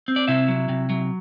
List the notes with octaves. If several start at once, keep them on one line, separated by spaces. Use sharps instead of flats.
C4
D5
C3 E4 E5
F#3
C3
F#3